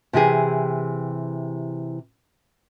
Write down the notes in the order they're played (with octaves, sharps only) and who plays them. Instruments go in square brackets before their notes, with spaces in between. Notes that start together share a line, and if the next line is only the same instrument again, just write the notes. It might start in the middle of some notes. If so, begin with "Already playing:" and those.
[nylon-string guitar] C3 E3 G4 G#4